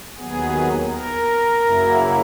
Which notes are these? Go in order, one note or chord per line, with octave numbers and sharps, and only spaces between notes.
D#2 D#3 F#3 B3 G#4
A#4
F#2 C#3 F#3 A#3 E4